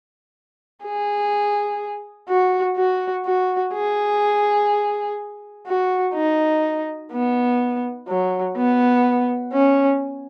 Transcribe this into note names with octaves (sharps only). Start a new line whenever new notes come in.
G#4
F#4
F#4
F#4
G#4
F#4
D#4
B3
F#3
B3
C#4